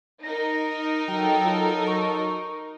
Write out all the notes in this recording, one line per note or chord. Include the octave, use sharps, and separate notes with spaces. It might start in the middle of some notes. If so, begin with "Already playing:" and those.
D#4 A#4 A#6
F#3 A4 G5
F4
C#6